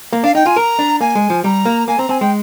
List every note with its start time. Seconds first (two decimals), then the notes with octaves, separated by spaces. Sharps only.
0.13 A#3
0.24 D4 F5
0.35 D#4 G5
0.46 F4 G#5
0.56 A#4 A#5
0.79 D4
1.01 A#3 G#5
1.15 G#3
1.30 F3
1.44 G3 A#5
1.66 A#3
1.88 A#3 G#5
1.99 C4 A#5
2.09 C4 G#5
2.20 G#3 G5